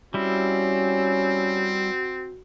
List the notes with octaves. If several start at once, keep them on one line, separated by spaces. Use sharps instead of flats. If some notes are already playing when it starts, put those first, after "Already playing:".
G3 C4 C#4 E4 F#4